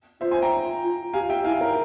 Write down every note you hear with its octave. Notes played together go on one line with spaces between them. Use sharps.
F4 C5 E5
G#5 C6
G5 A#5
F4
G4 F5 G#5
G4 E5 G5
E4 F5 G#5
A#4